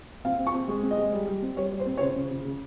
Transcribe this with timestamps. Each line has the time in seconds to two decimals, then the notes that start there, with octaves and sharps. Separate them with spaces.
0.25 C4 F5
0.39 C4
0.47 C#6
0.54 C4
0.68 G#3
0.83 C4
0.91 D#5
0.98 G#3
1.13 G3
1.27 G3
1.43 C4
1.57 G3 C#5
1.72 G3
1.80 C5
1.86 C4
1.97 C#5
2.01 C#3 C5
2.16 C#3
2.31 C#3
2.45 C#3